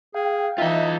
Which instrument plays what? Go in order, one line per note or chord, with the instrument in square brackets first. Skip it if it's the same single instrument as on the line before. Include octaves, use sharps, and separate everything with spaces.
[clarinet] G#4 [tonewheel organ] F5 G5
[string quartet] E3 D#4 [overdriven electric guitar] F4 D#5 [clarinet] E5